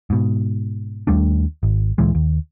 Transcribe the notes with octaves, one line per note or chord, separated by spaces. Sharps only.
G#2 B2
D#2 G3 A3 D4
G#1
D2 A#2 E3 G#3
D#2